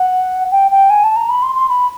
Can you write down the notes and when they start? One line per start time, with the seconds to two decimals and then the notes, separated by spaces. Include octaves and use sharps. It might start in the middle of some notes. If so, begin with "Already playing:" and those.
Already playing: F#5
0.52 G5
0.71 G5
0.90 G#5
1.04 A5
1.16 A#5
1.29 B5
1.43 C6
1.55 C6
1.69 B5